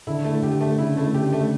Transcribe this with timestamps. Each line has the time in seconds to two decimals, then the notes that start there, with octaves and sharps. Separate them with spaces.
0.07 D3 E4
0.25 A3
0.42 D3 G4
0.61 A3
0.78 C#3 E4
0.97 A3
1.14 D3 G4
1.33 A3